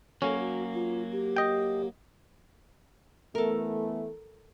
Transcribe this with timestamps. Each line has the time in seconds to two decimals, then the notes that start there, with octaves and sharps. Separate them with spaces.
0.22 F#3 A#3 C#4 A4
0.39 F#4
0.74 F4
1.12 G4
1.36 D#5 G5
3.35 E3 A3 B3 A4 A#4